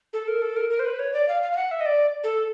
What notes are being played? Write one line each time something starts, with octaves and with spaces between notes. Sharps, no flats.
A4
A#4
A4
A#4
A#4
C5
B4
C#5
D5
F5
F5
F5
F#5
E5
D#5
D5
A4